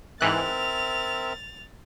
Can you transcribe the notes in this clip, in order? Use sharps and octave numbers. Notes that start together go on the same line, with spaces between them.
G#2 E3 C4 A#4 E5 F#6 A6 F7